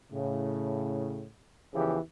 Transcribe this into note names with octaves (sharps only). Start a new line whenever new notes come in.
A2 C#3
E2 C#3 E3 F3 G4 G#4